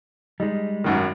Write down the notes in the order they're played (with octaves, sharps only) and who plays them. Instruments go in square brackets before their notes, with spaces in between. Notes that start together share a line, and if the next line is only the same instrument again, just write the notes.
[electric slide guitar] G3 G#3 [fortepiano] D#4
[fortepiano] G#1 F#2 D#3